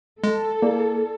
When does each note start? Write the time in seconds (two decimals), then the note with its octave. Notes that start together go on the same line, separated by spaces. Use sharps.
0.24 G#3 A4
0.62 A#3 E4 G#4 D5